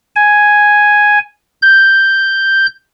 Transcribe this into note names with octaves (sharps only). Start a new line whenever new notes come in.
G#5
G6